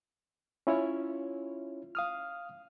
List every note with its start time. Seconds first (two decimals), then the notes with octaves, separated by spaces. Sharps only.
0.67 C#4 E4 F4 C#5
1.95 F5 D#6 F6